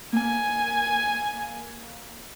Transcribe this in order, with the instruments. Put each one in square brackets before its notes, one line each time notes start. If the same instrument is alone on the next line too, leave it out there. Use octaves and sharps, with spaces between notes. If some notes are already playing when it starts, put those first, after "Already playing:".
[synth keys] A#3 [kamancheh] G#5